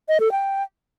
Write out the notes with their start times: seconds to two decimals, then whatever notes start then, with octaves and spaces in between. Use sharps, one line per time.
0.09 D#5
0.20 A4
0.32 G5